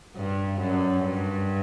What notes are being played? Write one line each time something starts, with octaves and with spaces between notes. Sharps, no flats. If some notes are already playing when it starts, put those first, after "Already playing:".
G2
F#2
G2